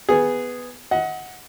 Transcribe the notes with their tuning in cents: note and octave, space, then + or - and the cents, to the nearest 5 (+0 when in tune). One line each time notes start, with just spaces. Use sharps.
B3 +5 G#4 -5
D#5 +35 F#5 +0